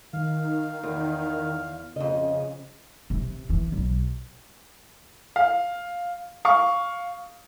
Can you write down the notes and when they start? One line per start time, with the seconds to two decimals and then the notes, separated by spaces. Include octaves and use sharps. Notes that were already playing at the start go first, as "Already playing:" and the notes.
0.13 D#3 F5
0.83 E2
1.96 F2 C#3 D#5
3.10 C3
3.50 E3
3.72 B1
5.36 F5
6.45 F5 C#6